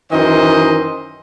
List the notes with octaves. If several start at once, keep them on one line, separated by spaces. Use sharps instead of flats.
F#2 D#3 E3 C5 D#5